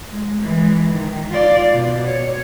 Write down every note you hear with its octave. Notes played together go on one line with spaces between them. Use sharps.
G#3
E3 G#3
D#3
F4 D5
B2
C#5